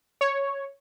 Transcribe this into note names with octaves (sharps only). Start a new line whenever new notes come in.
C#5